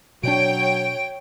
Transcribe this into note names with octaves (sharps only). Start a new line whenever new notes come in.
B2 F#3 D4 C#5 G5 D7